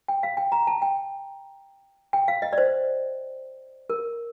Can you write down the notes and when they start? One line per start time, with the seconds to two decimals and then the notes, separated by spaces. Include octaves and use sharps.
0.08 G5
0.23 F5
0.37 G5
0.52 A#5
0.67 A5
0.82 G5
2.13 G5
2.28 F5
2.42 D#5
2.53 D5
2.58 C5
3.90 A#4